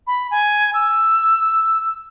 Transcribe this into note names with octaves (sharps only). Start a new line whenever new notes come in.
B5
G#5
E6